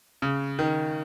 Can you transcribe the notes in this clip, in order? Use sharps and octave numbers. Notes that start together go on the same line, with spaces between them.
C#3
D#3